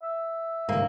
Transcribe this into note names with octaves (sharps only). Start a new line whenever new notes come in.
E5
G1 C2 G#2 A#3